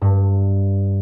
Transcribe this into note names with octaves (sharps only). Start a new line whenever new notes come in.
G2